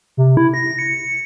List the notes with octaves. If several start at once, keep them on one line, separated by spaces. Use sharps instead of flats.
C3
E4
A#6
C#7